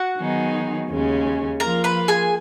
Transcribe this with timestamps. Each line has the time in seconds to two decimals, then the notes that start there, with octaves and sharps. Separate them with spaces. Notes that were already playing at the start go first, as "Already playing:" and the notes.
Already playing: F#4 F#5
0.18 D#3 F#3 B3 D#4 G#4
0.90 D#2 C#3 G#3 C#4
1.60 F3 A#3 F4 A#4 A#5
1.84 B4 B5
2.08 G#4 G#5